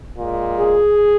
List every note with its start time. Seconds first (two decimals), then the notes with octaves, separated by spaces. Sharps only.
0.17 A#2 G#3
0.57 G#4